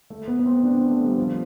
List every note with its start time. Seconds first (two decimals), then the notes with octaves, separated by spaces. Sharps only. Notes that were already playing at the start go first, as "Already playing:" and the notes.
0.10 A3
0.28 B3
0.39 B3
0.46 C4
0.64 D4
0.77 C4
0.91 A3
1.04 G3
1.18 F3